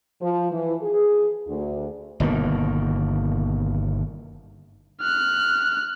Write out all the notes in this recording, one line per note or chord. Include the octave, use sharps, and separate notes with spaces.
F3
E3
G#4
D2
G1 B2 D#3 A#3
F6 F#6